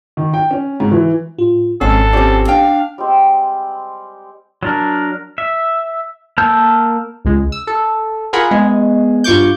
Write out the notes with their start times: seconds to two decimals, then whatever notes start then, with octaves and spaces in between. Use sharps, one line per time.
0.17 D#3
0.34 G5
0.51 C#4
0.80 G#2
0.91 E3
1.38 A2 F4
1.81 G#1 F2 G#3 C4 C#4 A4 F#5 C7
2.13 F3 C4 C#4 G4 D5
2.48 D4 F5 G5
2.98 G3 G#3 C4
4.63 F#3 D4 A#4
5.38 E5
6.38 A#3 A#4 A5 E6 G6
7.25 C#2 G#3
7.52 E6
7.67 A4
8.33 F4 G#4 A#4 F#5 B5
8.51 G#3 B3 G#4
9.24 G2 F4 C#6 D6 G6